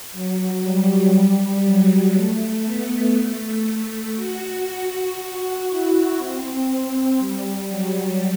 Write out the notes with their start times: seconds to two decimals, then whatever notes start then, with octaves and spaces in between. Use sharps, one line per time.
0.12 F#3
0.63 G3
1.64 F#3
2.14 A3
2.65 B3
3.15 A3
4.15 F#4
4.66 F#4
5.67 E4
6.18 C4
7.18 G3
7.68 F#3